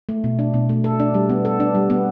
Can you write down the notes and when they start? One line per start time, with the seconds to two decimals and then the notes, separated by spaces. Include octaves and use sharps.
0.09 A3
0.24 B2
0.39 D4
0.54 B2
0.69 A3
0.84 A4
1.00 D4
1.14 G3
1.30 B3
1.45 A4
1.60 D4
1.75 G3
1.90 B3